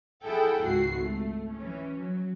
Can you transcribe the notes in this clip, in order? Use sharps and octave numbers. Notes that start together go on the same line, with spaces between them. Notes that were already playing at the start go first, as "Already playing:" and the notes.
E4 G#4 A4 F#5 G5
G#1 C#2 F#4 C7
A3
E3 C#4
F#3